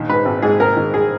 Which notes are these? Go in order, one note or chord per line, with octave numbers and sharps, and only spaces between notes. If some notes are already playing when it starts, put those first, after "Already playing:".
Already playing: A#1 D#3
G#2 B4
G#1
G#2 G#4
G#1 A#4
D#3
G#4